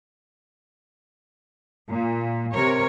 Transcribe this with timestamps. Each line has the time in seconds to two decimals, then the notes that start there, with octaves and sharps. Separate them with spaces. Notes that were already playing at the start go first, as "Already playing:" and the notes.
1.89 A#2
2.52 C3 A#4 C#5